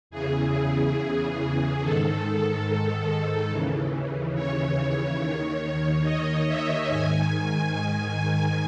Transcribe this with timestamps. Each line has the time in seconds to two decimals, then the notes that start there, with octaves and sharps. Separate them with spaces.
0.11 E2 C#3 E3 G#4
1.80 G#2 D#3 A4
3.49 D#2 C#3 E3
4.34 C#5
5.19 D#2 D#3
6.03 D#5
6.46 E5
6.88 G#2 D#3 G#5